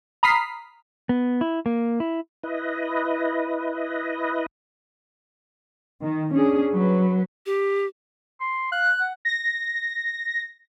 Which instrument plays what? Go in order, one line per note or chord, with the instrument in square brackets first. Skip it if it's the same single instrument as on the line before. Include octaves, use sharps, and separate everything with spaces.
[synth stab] A#5 B5 D#6 F6 B6 C7
[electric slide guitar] B3
E4
A#3
E4
[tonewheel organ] E4 B4 D#5
[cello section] D#3
C#4 D4 G#4
F#3 B4
[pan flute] G4
[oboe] C6
[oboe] F5 [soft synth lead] F#6
[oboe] F#5
[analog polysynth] A#6